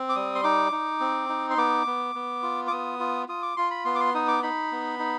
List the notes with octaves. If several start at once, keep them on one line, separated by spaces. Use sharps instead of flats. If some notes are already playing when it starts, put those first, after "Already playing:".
Already playing: C4
D6
G3 D#6
C6
D#4 D6
D#4
C4
D#4
C6
B3 D6
B3
B3
F4
D6
B3 D#6
F4
F4 D#6
D6
F4 C6
B5
B3 C6
D6
C6
D#4 D#6
D6
D#4 B5
B3
D#4